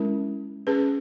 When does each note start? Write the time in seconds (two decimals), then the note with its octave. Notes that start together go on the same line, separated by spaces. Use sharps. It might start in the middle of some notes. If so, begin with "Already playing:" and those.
Already playing: G#3 C#4 E4 A#4
0.67 C#4 G#4 B4